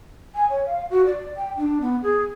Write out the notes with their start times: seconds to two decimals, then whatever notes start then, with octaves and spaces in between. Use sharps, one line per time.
0.34 G#5
0.50 C#5
0.66 F5
0.90 F#4
1.06 D5
1.37 G5
1.57 D4
1.81 B3
2.02 G#4